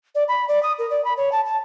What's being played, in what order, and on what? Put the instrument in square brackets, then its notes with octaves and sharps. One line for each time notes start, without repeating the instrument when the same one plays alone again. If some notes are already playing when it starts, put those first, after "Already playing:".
[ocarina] D5
B5
D5
D#6
A#4
D5
B5
C#5
A5
A5